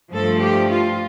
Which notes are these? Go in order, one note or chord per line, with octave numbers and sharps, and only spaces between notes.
G2 F3 A3 A4
G4
F4